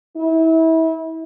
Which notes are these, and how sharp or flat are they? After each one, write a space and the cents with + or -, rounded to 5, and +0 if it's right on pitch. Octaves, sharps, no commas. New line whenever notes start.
E4 -30